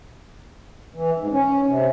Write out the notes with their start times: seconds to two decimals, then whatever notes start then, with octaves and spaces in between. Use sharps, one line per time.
0.94 E3
1.18 G#2
1.32 C#4
1.67 C3